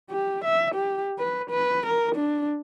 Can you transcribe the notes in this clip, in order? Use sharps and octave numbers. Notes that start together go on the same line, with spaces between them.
G4
E5
G4
B4
B4
A#4
D4